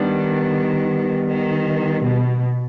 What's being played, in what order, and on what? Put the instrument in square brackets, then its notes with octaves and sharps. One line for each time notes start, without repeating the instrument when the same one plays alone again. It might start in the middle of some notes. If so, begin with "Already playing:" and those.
Already playing: [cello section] D#3 [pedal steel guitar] G3 B3 D4
[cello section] D#3
B2